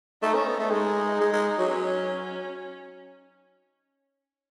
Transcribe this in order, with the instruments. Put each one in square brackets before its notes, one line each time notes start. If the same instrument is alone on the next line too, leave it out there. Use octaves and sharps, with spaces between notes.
[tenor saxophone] A3 [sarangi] D#4
[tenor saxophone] C#4
B3
A3
[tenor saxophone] G#3 [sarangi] D#4
[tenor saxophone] G#3
G#3
F#3
[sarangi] C#4